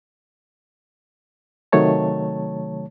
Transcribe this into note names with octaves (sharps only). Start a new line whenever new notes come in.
C3 D#3 F#3 A3 C#5 A5